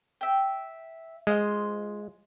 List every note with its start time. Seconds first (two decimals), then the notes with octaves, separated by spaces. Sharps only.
0.21 E5 G5
1.27 G#3 F4 C5 D#5